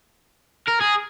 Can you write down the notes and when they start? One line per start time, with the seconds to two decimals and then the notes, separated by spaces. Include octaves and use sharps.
0.68 A#4
0.81 G#4